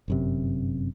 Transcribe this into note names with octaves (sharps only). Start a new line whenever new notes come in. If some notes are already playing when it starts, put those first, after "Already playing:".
G1 F#2 C3